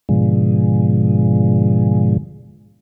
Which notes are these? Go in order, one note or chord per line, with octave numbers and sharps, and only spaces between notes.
G#2 B2 D3 F3 G#3